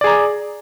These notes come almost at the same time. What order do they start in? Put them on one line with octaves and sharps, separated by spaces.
D5 G#4 A#5